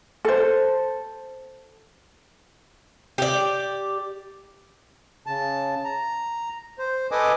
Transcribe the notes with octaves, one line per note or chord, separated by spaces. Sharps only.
A4 C5
G4 D5
C#3 A5
A#5
C5
A4 B4 D#5 G#5 D6 D#6